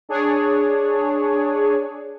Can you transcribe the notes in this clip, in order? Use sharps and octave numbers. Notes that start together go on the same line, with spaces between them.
D4 G#4 C#5